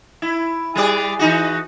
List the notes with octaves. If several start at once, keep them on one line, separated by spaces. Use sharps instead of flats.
E4
G3 G#4 D5
E3 D#4 F#4